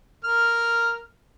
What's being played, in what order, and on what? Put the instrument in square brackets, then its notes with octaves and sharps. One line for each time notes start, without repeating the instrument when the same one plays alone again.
[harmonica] A#4 F6